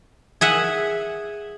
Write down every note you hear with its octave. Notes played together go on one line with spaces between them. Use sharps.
G#4 E5 F#5